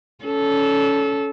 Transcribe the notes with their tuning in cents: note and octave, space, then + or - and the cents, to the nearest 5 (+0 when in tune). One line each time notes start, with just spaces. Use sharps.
C#4 +15 A4 -15